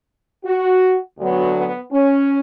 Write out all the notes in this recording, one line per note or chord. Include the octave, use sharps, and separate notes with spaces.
F#4
D2 D3 F#3 B3
B3
C#4